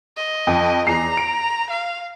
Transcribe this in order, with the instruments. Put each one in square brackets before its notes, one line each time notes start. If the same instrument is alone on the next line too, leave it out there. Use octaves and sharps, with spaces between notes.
[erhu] D#5
[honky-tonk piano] F2
[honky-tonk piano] E2 C7 [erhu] A#5
[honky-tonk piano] D7
[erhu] F5